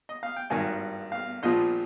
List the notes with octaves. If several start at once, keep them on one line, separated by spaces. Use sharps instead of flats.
D#5
F5
G5
G#1 G2 D#3 G#5
F5
A#1 A#2 F3 D#5